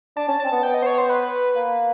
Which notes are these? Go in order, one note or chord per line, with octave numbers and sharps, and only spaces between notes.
D4 A5
C#4
C4 A5
B3
B3 G5
D#5
C5
C#5
C5
B4
A#3